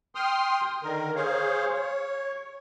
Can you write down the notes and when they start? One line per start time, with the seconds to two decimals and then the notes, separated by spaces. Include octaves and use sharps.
0.15 G5 C6 D#6 F6
0.83 D3 D#3 A#4
1.16 G#4 C5 C#5 F5
1.74 C#5